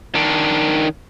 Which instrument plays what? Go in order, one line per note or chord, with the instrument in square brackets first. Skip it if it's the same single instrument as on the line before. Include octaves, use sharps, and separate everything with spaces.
[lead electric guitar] D#3 D4